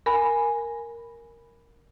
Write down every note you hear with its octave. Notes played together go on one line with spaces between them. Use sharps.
A#4 G#5 B5